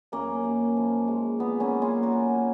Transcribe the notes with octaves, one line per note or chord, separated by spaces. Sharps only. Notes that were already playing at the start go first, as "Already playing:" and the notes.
F#2 A#3 C#4
F#2
F3
G#3
A#2 B3
A#3 C#4
F#3
F4 G#4
F#3 F#4 A#4
A#2